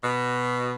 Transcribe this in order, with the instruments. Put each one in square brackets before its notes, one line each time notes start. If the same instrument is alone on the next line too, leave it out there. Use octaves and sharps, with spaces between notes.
[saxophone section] B2